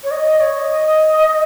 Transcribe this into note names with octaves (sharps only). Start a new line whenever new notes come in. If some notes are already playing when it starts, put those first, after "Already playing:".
C#5
D#5
D#5
C#5
D#5